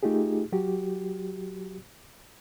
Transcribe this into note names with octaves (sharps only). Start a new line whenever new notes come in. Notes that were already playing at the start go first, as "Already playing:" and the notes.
A3 D#4 F4 G4 G#4
F#3 F#4 G4